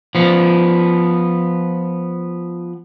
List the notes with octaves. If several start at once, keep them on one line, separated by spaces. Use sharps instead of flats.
F3 B3